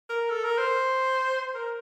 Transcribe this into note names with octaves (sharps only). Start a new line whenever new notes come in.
A#4
A4
A#4
C5
A#4